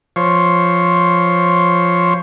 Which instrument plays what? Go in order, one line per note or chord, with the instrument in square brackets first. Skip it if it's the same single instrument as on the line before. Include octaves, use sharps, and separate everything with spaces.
[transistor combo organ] F3 C5 C#5